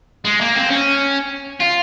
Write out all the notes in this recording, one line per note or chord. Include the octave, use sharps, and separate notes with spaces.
G#3
A#3
C4
C#4
F4